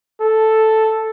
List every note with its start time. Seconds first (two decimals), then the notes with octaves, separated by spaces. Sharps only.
0.21 A4